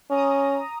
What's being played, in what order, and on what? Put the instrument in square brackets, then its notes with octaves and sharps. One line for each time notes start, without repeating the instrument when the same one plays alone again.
[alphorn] C#4 [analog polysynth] A#5 D#6